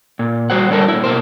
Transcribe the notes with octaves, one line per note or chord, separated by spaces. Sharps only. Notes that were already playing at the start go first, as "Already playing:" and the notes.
A#2
G3 F#4 C5 F#5
D3 G3 D4 F#4 A4 A#4
A#2 E4
B2 A#3 C5